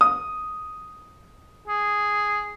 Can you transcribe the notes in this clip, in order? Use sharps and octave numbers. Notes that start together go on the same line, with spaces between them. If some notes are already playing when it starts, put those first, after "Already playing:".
D#6
G#4